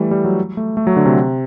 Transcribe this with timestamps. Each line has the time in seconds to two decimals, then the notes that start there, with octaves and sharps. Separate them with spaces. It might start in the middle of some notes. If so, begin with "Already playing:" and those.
Already playing: E3 G3 A3
0.11 G3
0.25 F#3
0.57 A3
0.77 A3
0.87 F#3
0.96 D3
1.06 C3